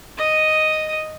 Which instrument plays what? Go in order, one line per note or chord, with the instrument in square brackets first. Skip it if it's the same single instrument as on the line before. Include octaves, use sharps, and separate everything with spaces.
[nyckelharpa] D#5 D#6